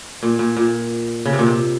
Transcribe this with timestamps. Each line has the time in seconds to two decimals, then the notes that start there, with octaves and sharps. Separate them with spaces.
0.23 A#2
0.39 A#2
0.57 A#2
1.25 C#3
1.33 C3
1.39 A#2
1.46 C3